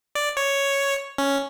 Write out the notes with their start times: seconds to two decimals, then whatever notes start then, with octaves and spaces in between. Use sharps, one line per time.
0.15 D5
0.37 C#5
1.18 C#4